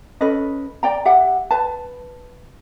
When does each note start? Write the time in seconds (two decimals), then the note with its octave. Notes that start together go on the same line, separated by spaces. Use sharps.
0.21 C#4 A4 B4 D#5
0.83 D5 G5 A#5
1.05 G4 E5 F#5 G5
1.51 B4 A5